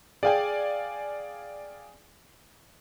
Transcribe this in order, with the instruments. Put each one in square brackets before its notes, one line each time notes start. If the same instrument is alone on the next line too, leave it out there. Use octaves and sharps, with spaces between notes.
[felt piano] G#4 G5 [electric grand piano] D5 F5 G#5